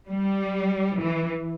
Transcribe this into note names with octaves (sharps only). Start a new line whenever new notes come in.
G3
E3